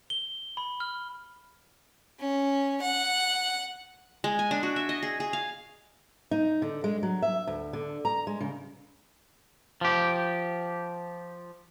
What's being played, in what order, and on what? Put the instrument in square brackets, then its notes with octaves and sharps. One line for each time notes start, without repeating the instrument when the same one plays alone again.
[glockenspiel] G7
B5
F6
[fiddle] C#4
F#5
[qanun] G#3
G#5
D4
F#4
E5
D#5
G#4
G#4
F5
[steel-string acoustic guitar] D#4
D3
G#3
F#3
E5
D2
D3
A#5
G#3
C#3
[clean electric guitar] F3 G4